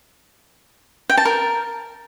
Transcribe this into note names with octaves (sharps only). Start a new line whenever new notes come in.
G5
A5
A#4